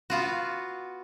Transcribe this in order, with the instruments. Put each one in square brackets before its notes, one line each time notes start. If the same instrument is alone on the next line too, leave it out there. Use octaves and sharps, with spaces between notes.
[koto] B3 F4 F#4